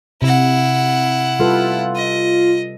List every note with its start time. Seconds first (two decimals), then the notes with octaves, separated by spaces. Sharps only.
0.22 C3 E4 F#5
1.40 G3 F4 A4 B4
1.95 F4 D#5